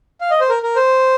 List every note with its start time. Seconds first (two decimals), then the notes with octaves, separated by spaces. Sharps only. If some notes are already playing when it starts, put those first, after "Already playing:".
0.21 F5
0.31 D#5
0.41 C5
0.49 A#4
0.63 A#4
0.76 C5